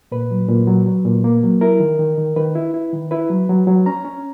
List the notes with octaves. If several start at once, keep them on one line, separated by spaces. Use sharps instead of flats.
A#2 B4
F#3
A#2
F#3
F#3
A#2
A#3
F#3
E4 A#4
D#3
D#3
D#3
D#3 B4
E4
E4
D#3
E4 B4
F#3
F#3
F#3
C#4 A#5
C#4